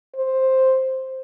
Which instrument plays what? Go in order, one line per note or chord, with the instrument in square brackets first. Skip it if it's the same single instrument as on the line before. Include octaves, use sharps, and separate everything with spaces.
[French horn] C5